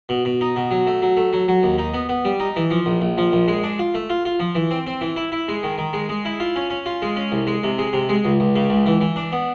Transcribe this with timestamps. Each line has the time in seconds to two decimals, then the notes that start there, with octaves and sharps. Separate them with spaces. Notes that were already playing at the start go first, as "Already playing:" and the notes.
0.09 B2
0.25 B2
0.41 D#4
0.56 B2
0.71 F#3
0.87 A3
1.02 F#3
1.17 A3
1.33 F#3
1.48 F#3
1.63 D#2
1.78 D#4
1.94 B3
2.09 B3
2.25 G3
2.40 D#4
2.56 E3
2.71 F3
2.86 A#1
3.01 A#1
3.18 F3
3.33 A#1
3.48 G#3
3.64 D4
3.79 F4
3.94 A3
4.10 F4
4.25 F4
4.40 F3
4.55 E3
4.71 C4
4.87 C4
5.01 E3
5.16 E4
5.32 E4
5.48 G#3
5.63 D#3
5.78 D#3
5.93 G#3
6.09 G#3
6.25 E4
6.40 F4
6.56 C#4
6.70 C#4
6.86 F4
7.02 G#3
7.16 C#4
7.32 C2
7.47 G#3
7.64 C3
7.78 G#3
7.93 C3
8.09 G#3
8.25 C#2
8.40 C#2
8.56 C#3
8.70 C#2
8.86 E3
9.01 E3
9.16 D4
9.32 B3